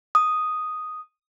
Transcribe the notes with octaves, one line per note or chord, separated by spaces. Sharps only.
D#6